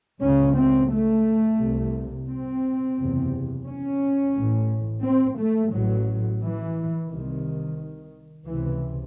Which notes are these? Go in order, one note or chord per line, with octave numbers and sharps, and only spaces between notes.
C#2 C#3 C#4
C4
A3
C2 C3
C4
F#1 E2 C3
C#4
A1 A2
C4
A3
A1 A2 F#3
E3
C2 C3 D#3
C#2 C3 E3